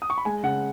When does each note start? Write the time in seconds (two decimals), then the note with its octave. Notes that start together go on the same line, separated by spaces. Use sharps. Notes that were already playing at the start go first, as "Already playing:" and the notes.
0.02 D#6
0.10 C#6
0.18 B5
0.25 G#3 G#5
0.43 C#3 F#5